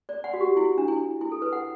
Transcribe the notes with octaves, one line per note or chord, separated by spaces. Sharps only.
D5
F#5
F#4
G4
E4
D4
E4
E4
A4
B4
F#5